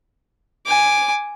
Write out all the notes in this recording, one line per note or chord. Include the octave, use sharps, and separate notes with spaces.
G#5 D6